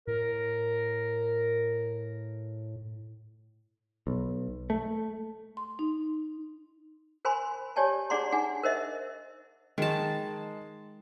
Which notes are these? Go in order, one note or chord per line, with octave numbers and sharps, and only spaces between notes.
A2 A#4
B1
A3
C6
D#4
A#4 C5 G#5 B5 C6
G4 C#5 D5 G#5 A5
D4 G#4 D5 F#5 A#5 C6
D4 D#4 G#4 F#5 G#5
A#4 C5 D#5 E5
D#3 G#3 A5